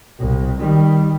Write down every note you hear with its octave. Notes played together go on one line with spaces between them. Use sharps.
C2
D#3 G3